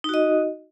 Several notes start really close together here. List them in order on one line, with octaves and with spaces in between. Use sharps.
D#4 F#4 D#5